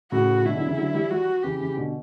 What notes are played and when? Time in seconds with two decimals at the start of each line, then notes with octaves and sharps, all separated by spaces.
0.12 A2 C#3 F#4
0.45 B2 D3 E4
0.56 D3 F#3
0.67 C#3 E3
0.78 D3 F#3
0.94 E3 G3
1.11 E3 G3 F#4
1.43 C#3 E3 G4
1.61 C#3 E3
1.77 B2 D3